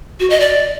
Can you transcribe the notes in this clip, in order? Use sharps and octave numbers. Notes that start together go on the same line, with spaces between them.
F#4
D#5
D5